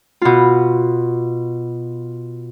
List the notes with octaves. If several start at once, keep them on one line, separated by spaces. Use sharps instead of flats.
B2 F4